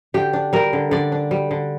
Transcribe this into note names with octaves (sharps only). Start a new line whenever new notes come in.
D3 G4
D4
G3 A#4
D3
D3 D5
D4
G3
D3